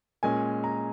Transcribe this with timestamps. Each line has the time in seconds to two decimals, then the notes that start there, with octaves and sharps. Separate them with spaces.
0.23 A#2 G#3 C#4 G#5
0.64 A#5